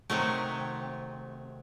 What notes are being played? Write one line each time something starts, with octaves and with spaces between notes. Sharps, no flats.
C3 D#3 F#3 A3